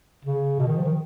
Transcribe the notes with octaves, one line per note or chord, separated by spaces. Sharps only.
C#3
B2
D#3
F3
D#3